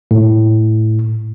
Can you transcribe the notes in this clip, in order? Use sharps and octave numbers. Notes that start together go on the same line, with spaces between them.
A2